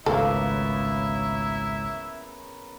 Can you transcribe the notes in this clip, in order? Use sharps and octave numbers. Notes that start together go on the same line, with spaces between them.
G#1 C#2 A2 C#3 A#3 B3 E4 A4